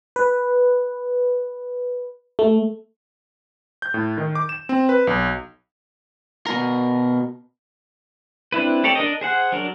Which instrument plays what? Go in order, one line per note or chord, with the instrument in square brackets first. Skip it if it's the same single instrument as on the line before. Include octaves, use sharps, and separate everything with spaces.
[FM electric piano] B4
A3
[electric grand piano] G6
A2
D#3
D6
E7
C4
B4
B1
[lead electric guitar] B2 A#4
[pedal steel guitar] C4 D4 E4 B4
C4 G4 A4 C#5 D5
D4 A#4 D#5
G#4 C5 F#5
F#3 D4 A#4